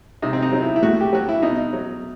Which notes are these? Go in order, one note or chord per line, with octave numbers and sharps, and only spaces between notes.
C3 D#4
C4
D#4
F#3
E4
E4
A2 F#4
G4
F#3 F#4
E4
B2 D#4
F#3